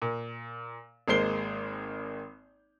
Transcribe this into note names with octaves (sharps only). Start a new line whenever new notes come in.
A#2
G#1 G#3 A#3 C5 C7 G7